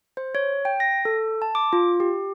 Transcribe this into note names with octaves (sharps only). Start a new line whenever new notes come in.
C5
C#5
G5
A#6
A4
A5
D6
F4
G4